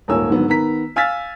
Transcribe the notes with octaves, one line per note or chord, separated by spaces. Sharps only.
D#1 G#2 A#4 C#5 G#5 E6
G#2 D3 D#3 F#3 B3
D#3 B3 A#5 B6
F5 G#5 E6 F6 A6 B6